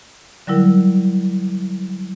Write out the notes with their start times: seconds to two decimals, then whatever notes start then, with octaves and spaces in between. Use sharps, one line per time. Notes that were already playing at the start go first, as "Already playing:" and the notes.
0.47 D3 F#3 G3 E4 A#4